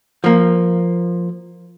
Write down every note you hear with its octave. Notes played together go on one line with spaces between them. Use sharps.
F3 A#3